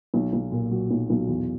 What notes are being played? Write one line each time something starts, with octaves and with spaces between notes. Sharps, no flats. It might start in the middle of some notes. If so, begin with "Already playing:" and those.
B1
B1
A#2
F#3
B1
B1
E2